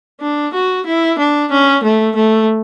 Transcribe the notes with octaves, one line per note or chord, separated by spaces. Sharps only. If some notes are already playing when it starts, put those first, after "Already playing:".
D4
F#4
E4
D4
C#4
A3
A3